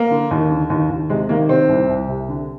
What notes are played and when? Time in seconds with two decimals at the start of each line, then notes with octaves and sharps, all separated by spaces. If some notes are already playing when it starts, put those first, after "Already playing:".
Already playing: A#3
0.10 D3
0.31 D#2
0.50 D3
0.70 D#2
0.90 D#2
1.10 C3 G#3
1.29 D#3 A#3
1.49 C3 C4
1.69 C2
1.89 C2
2.08 C3
2.28 D3